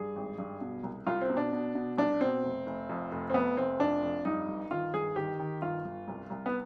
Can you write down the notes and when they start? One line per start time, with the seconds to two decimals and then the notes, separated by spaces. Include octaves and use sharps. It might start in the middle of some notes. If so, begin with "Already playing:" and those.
Already playing: G2 G#4
0.16 G#1
0.38 G2
0.61 B2
0.83 C2
1.07 C2 F4
1.21 C4
1.29 B2
1.37 D4
1.53 B2
1.75 B2
1.98 C2 D4
2.21 B2 C4
2.43 F1
2.66 F1
2.89 F2
3.12 F1
3.30 C4
3.34 F1 B3
3.57 F1 C4
3.79 F2 D4
4.02 F2
4.25 G2 D#4
4.48 G1
4.71 D#3 F4
4.94 G1 G#4
5.16 D#3 G4
5.39 D#3
5.62 G1 F4
5.85 G1
6.08 C2
6.30 C2
6.46 B3